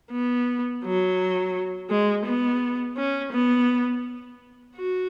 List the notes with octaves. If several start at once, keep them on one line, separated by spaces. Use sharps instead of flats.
B3
F#3
G#3
B3
C#4
B3
F#4